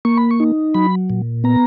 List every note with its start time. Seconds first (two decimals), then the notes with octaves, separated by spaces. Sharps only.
0.05 A#3 C#6
0.17 B5
0.31 C#6
0.40 D#4
0.74 F#3 B5
1.10 A#2
1.44 B3 A#5